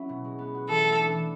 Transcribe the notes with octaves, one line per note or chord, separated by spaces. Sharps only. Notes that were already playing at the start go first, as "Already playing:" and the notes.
Already playing: F#3 C#4 E4
B2
G#3
B3
F#4
E3 A4
A3
D4
E3